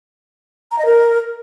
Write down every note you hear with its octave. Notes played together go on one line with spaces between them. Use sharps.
A#5
D#5
A#4